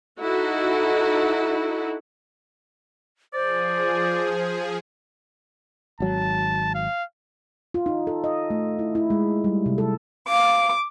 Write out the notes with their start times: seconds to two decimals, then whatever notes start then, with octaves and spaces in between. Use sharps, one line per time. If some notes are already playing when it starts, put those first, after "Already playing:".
0.21 D#4 E4 F#4 A4
3.34 F3 G#4 C5 D5
6.00 G#1 F#3 A5
6.75 F5
7.74 F4
7.86 D#4
8.07 A4
8.24 D#5
8.50 A3
8.79 E4
8.95 E4
9.10 G#3
9.44 G3
9.66 C3
9.78 A4
10.28 F5 D6